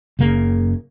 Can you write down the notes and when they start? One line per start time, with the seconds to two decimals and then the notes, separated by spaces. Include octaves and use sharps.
0.19 F#1 C#3 A#3